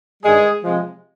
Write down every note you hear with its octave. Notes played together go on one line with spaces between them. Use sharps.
G2 D#3 G3 G#3 G#4
C3 F3 G#3